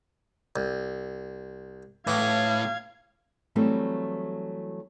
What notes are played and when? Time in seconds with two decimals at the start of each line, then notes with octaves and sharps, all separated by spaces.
0.56 C2
2.07 A2 E3 F5 G#6
3.56 E3 F#3 G3 A3 C4